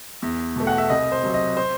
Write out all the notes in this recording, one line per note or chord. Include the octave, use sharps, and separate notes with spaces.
E2
B2 A3
F#5
E5
C2 D#5
C5
C3 F#3
D#5
C5